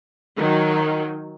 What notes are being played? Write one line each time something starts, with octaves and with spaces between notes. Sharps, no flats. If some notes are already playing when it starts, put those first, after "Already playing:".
D#3 F#3